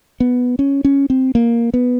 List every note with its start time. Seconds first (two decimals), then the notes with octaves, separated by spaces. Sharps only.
0.20 B3
0.59 C#4
0.85 C#4
1.10 C4
1.35 A#3
1.74 B3